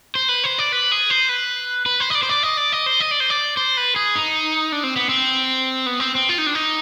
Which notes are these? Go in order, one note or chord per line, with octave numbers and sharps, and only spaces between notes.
C5
B4
C5
D5
B4
G#4
C5
B4
B4
C5
D#5
D5
C5
D5
D#5
D5
D#5
C5
D#5
D5
C5
D5
C5
B4
G#4
D#4
D4
C4
B3
C4
B3
C4
C4
F4
D#4
D4
D#4